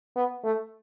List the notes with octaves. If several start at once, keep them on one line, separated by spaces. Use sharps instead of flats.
B3
A3